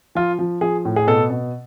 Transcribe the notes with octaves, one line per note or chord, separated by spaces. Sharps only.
F3 F4
F3
F3 G#4
A2
G#4
B2 A4
B2